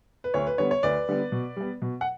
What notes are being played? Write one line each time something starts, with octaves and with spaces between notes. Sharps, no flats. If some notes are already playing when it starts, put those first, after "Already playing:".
B4
D2 C#5
B4
D3 G3 B3 C#5
C#5
D2 B4 D5
D3 G3 B3
B2
G3 B3
B2
F#5